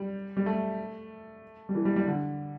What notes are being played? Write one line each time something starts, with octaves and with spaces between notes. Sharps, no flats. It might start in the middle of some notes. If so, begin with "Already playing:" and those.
Already playing: G3
G3
A3
G3
E3
G3
G3
D3